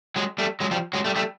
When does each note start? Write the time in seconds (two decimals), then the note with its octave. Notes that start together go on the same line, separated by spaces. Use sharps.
0.16 F#3 G#3
0.38 G3 A3
0.60 F#3 G#3
0.71 F3 G3
0.93 F#3 G#3
1.05 G3 A3
1.16 G3 A3